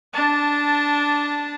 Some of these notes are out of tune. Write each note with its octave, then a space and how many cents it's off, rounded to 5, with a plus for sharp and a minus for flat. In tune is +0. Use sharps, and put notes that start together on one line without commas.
D4 -10 A5 +0